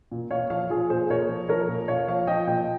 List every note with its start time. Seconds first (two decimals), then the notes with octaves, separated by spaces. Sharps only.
0.12 A#2
0.31 A#2 C#5 F5
0.50 F3 C#5 F5
0.70 F3 F4 G#4
0.90 A#2 G#4 C5
1.10 A#2 A#4 C#5
1.29 F3
1.49 F3 A#4 C#5
1.68 A#2
1.88 A#2 C#5 F5
2.08 F3 C#5 F5
2.27 F3 D#5 G5
2.47 A#2 D#5 G5